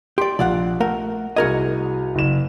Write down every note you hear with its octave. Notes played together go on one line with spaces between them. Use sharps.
G4 D5 C6
A#1 D5 F5 F#5
A3 A#4 F#5
C2 F#4 G#4 A#4 D#5 G#6
F#1 E7